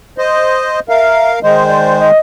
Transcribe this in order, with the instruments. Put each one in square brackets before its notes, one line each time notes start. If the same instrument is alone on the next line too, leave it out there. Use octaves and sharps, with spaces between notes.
[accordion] C5 D#5
[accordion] A#4 F5 [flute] E5
[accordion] D#3 G#3 C5 [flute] D#5
[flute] D5
D#5